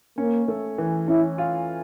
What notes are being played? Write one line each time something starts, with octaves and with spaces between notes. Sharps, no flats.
A#3 C#4
A3
E3
C#4 E4
F4